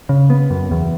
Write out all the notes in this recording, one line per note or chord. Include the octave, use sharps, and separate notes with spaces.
C#3
B3
F#2
E2